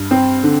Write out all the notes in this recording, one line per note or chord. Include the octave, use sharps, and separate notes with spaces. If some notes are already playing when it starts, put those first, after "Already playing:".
Already playing: G2
C4
D3